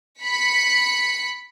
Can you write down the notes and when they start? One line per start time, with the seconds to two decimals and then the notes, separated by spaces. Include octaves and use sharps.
0.21 B5 B6 C#7